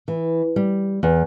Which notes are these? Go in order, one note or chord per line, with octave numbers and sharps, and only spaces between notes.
E3
G3
E2